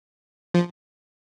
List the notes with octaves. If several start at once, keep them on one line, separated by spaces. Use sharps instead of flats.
F3